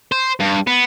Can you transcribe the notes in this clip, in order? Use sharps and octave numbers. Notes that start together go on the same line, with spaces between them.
C5
G2
B3